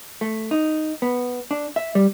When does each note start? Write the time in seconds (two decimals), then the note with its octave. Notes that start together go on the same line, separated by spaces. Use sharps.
0.21 A3
0.51 D#4
1.02 B3
1.51 D4
1.76 E5
1.95 G3